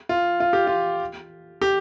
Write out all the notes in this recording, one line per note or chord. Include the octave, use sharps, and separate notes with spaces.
F4
F4
G4
F4
G4